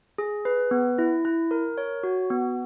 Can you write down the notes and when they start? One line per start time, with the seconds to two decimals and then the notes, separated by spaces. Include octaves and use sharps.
0.18 G#4
0.45 B4
0.71 B3
0.98 E4
1.25 E4
1.51 A#4
1.78 C#5
2.03 F#4
2.30 B3